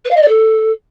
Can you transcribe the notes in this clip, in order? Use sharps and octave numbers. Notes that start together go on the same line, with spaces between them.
B4
F5
D#5
D5
A4